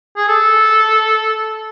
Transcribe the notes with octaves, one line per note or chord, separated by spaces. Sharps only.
G#4
A4